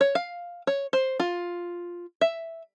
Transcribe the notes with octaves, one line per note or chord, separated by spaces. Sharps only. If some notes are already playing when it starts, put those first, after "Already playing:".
C#5
F5
C#5
C5
F4
E5